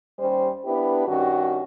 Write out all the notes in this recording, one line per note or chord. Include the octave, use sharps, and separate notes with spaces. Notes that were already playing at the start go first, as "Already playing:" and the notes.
D#2 G3 C#4 C5
B3 D4 E4 G4 B4
G2 D#3 C#4 F#4